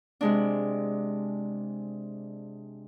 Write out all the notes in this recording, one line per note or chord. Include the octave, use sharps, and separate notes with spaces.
C3 G#3 D4